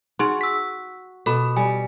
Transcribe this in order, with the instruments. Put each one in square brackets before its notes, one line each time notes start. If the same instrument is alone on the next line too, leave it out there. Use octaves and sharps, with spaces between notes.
[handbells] D#4 G#4 C6 [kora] F#4
[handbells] E6 B6
[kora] B2 [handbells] A4 B5
[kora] G3 [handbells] G#5